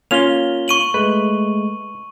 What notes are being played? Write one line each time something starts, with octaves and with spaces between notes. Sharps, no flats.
A#3 C#4 F4 F7 G7
C#6 D#7 F#7
G#3 A3 B4